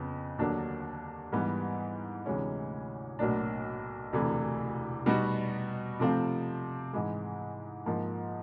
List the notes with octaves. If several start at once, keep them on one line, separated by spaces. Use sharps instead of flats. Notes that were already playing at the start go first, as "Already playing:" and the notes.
Already playing: F2 C#3 B3
D#2 D3 F#3 A#3 D4
G#2 E3 G3 B3
D2 C3 E3 G#3 C#4
B1 A2 F#3 A#3 D4
E1 D2 C3 E3 A3
B2 G3 B3 D#4 F#4
C3 F3 A3 C4 F4
G#2 E3 G#3
G#2 F3 A#3